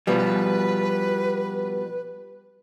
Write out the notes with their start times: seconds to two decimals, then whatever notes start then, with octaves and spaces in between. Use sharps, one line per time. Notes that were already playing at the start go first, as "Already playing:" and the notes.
0.07 B2 F3 G3 B4